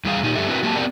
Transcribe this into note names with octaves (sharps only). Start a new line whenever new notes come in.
E2 G3 G#4 F5
A#2 D#4 G4
G2 G4 A4 E5
C4 D4 E4 F#4 A#4 B4
F#3 A#3 G4 F#5 A5
B3 C4 G4 A#4 D5 F#5